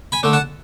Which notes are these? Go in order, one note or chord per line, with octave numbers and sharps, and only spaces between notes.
G#5 B5
D3 A3 D4
F#5 A5